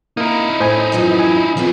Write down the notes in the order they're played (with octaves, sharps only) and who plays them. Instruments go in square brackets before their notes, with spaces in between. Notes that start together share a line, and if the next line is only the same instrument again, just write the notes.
[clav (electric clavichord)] A#3 A#4 [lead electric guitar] D#4 E4
[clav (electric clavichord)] A2 [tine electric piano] C5 G#5
[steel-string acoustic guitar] F#2 E3 F3
[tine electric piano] G#5
[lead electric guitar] F3 B3 [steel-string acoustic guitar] C4 D#4 F4